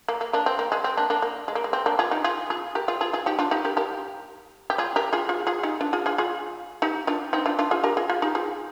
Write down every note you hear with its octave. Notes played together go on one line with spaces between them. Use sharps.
A#3
A#3
A#3 D4
C4
A#3
G#3
C4
A#3 D4
A#3 D4
A#3
G#3
A#3
G#3
C4
A#3 D4
F4 G#4
D#4 G4
F4 G#4
F4 G#4
G4 A#4
F4 G#4
F4 G#4
F4 G#4
D#4 G4
D4 F4
D#4 G4
G4 A#4
G4 A#4
G4
F4 G#4
G4 A#4
F4 G#4
F4 G#4
F4 G#4
D#4 G4
D4 F4
F4 G#4
F4 G#4
F4 G#4
D#4 G4
D4 F4
C4 D#4
D4 F4
D4 F4
F4 G#4
G4 A#4
F4 G#4
F4 G#4
D#4 G4
F4 G#4